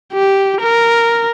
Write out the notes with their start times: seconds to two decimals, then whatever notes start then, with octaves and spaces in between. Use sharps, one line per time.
0.13 G4
0.61 A#4